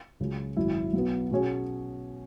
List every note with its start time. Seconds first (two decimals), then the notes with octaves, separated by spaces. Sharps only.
0.20 C#2 C#3 F#3
0.57 G#1 F#2 F#3 E4
0.93 B1 B2 B3
1.31 B2 F#3 C#4 G#4 C#5